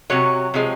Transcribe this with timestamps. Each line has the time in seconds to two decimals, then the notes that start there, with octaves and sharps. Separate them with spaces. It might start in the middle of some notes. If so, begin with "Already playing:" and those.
0.10 C3 F#3 C#5
0.54 C3 F3 G#3